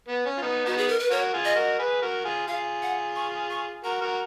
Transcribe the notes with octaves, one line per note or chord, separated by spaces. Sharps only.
B3
C#4
F4
B3 D#4
B3 D#4 F#4
G#4
A#4
B4
F#4 A#4 C#5
F4 G#4
D#5
F#4 A#4
G#4 B4
F#4 A#4
F4 G#4
F4 G#4 F5
F#5
C#6
C#6
F#4 A#4 A#5
F#4 A#4